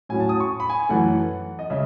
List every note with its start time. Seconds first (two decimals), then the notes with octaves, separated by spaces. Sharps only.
0.09 A2 F#3 C#4 G#5
0.20 A5
0.29 D#6
0.40 C#6
0.60 B5
0.69 G#5
0.80 G#5
0.89 F#2 E3 A3 F#5
1.59 D#5
1.70 C#3 G#3 E5